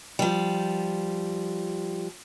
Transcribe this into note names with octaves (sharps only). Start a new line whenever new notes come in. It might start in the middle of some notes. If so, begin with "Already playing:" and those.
F3 G3